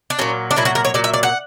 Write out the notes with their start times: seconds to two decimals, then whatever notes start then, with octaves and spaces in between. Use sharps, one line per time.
0.10 D4
0.19 A#2 F#3 C#4
0.51 D4
0.56 A#2 F#3 E4
0.65 F#4
0.75 A#4
0.85 C#5
0.94 A#2 F#3 D5
1.04 E5
1.14 D5
1.23 F#5